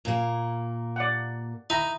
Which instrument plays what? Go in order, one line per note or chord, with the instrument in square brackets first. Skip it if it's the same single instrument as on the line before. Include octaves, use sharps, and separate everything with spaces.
[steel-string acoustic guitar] A#2 A#3
[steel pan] D5 F#5
[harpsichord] D#4 [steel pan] E4 A#5